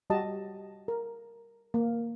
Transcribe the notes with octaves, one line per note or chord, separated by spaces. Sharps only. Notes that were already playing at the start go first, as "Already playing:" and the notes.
G3 F#4 G4 D#5 A5
A#4
A#3